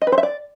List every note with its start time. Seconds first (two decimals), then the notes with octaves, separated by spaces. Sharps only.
0.02 D#5
0.07 B4
0.12 C5
0.18 E5
0.23 D5